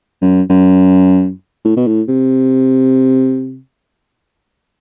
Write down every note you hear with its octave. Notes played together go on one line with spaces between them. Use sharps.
F#2
F#2
A2
B2
A2
C3